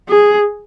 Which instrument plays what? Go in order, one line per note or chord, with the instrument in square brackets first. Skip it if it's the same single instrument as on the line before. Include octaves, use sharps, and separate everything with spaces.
[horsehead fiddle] G#4